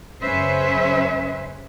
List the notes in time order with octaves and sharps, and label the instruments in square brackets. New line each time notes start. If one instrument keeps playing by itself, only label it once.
[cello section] F#2 C#3 C#4 B4 C5 E5